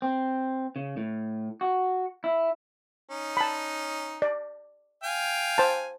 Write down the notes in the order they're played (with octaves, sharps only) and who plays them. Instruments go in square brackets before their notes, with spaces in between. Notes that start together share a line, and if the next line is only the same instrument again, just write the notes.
[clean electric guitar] C4
C#3
A2
F#4
E4
[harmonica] C#4 D#4
[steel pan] A5 B5
D5
[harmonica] F5 G5 G#5
[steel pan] C5 A5